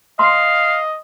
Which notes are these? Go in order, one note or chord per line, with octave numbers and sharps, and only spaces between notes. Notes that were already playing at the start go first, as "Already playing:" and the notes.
D#5 F5 C6